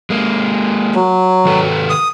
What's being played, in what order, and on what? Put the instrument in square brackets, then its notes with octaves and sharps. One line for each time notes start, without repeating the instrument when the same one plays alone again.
[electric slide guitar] G#3 A#3
[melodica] F#3
[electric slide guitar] D#3 A4 B4
[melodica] D#6